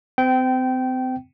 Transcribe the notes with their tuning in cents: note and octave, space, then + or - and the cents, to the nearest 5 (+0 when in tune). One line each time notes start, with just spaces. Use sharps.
C4 -35 G5 -20